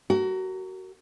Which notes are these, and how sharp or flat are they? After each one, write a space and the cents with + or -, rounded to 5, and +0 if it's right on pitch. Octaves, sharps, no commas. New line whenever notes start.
F#4 +25 A#4 -20